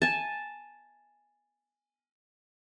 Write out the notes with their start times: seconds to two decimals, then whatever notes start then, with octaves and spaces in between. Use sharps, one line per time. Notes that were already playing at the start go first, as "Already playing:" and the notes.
0.02 G#5 A5